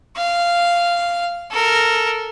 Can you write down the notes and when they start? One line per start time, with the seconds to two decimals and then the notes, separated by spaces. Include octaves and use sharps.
0.17 F5
1.51 A4 A#4